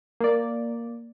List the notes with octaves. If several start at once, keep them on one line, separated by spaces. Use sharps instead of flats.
A#3 D5